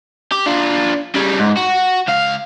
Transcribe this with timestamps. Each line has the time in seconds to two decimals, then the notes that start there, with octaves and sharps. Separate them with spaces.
0.32 G4
0.46 D4 F4
1.15 C#3 G3
1.39 G#2
1.57 F#4
2.08 C#2 F5